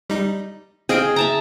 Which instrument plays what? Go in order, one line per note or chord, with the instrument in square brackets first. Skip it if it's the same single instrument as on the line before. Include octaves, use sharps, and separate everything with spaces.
[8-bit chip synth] G3 D#4
[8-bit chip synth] C4 D#5 F5 [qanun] G#4 G5
[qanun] E5 A5 A#5